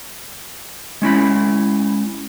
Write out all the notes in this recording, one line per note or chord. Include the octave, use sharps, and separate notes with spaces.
G#3 C#4 E4 B5